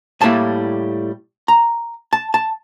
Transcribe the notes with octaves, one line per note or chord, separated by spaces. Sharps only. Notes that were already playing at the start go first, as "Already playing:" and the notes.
A2 G3 A#3 E4 A5
A#5
A5
A5